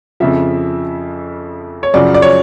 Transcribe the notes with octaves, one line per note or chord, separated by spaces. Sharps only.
F2 C#3 F3 E5
C#5
F#2 C#3 F3 D5
D5
C#5